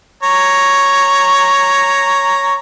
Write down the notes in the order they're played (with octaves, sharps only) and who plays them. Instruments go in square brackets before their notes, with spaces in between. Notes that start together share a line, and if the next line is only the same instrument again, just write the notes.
[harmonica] C#5 A#5